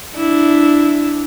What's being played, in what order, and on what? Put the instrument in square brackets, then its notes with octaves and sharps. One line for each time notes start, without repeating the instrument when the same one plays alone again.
[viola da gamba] D4 E4